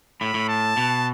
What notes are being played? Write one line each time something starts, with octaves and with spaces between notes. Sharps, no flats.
A2 B5
A2
A5
B2